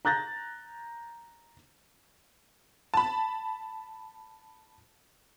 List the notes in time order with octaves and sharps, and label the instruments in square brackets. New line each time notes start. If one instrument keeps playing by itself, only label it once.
[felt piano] A#5 F#6 G6 A6 A#6
[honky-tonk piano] A5 B5